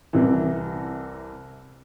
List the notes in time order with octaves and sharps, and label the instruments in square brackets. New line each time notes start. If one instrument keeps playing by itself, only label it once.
[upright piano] C2 C3 E3